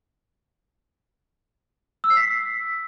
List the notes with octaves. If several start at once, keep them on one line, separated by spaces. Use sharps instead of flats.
E6
C7
B6